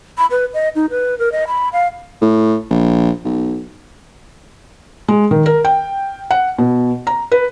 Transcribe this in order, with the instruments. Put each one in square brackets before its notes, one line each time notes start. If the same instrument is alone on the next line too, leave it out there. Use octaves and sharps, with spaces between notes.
[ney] B5
B4
D#5
D#4
B4
A#4
D#5
B5
F5
[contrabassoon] A2
A#1
B1
[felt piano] G#3
D#3
A#4
G5
F#5
B2
A#5
B4